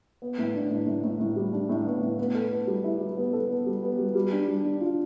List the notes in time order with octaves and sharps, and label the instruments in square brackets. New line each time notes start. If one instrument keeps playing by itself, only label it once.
[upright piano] B3
A2
D4
A2
A2
A2
A2
G3
D4
A2
B3
A2
B3
A4
B3
G3
E4
G3
B3
A4
B3
G3
B3
G3
G3
D4
G3
D4
F4